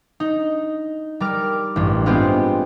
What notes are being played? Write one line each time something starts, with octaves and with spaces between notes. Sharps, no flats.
D#4
G3 A#4 D6 F6
A1 G2
G#3 B3 C4 F4 G4 G#4